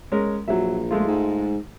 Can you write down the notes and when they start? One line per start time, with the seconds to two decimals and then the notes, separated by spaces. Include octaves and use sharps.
0.12 G#3 C#4 A#4
0.48 A#1 F#3 E5
0.91 G#3 A3 F4
1.07 G#2